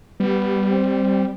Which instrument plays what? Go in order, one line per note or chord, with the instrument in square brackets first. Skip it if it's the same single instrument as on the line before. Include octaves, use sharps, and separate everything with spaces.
[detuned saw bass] G3 [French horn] B3
[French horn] C4